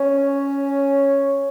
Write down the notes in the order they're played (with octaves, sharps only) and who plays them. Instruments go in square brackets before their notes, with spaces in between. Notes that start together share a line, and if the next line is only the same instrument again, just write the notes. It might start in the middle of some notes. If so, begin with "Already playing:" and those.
Already playing: [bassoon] C#4